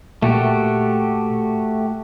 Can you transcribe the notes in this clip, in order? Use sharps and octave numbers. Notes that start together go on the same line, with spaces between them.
A#2 A3 F#4 G4